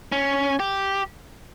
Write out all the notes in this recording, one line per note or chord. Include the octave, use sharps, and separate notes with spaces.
C#4
G4